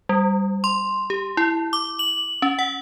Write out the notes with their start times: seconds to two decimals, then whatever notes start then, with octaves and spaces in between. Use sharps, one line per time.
0.09 G3
0.64 C6
1.10 G4
1.37 E4
1.73 D6
1.99 F#7
2.42 C#4
2.59 F#5